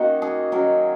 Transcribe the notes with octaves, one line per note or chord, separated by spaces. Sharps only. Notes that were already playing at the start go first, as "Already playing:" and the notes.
Already playing: D#3 A#3 C#4 D#4 F#4
G#4
D#3 F#3 C#4 A#4